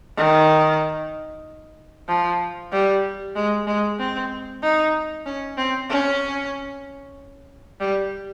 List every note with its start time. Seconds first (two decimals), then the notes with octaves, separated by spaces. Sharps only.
0.17 D#3
2.08 F3
2.72 G3
3.36 G#3
3.67 G#3
3.99 C4
4.62 D#4
5.26 C#4
5.58 C4
5.90 C#4
7.80 G3